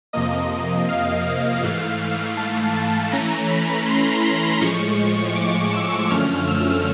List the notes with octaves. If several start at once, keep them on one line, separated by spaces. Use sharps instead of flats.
F2 C3 F3 A#3 D#5
F5
G#2 E3 A3
A5
A5
E3 A3 C#4 A#5
B5
C6
C6
A2 F3 G#3 C#6
D6
E6
F#2 D3 F3 A3 C#4 F6
E6